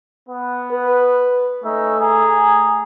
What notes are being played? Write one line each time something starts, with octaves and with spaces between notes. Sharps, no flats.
B3
B4
A3 C#4 D#4 E5
G#4 G#5 A#5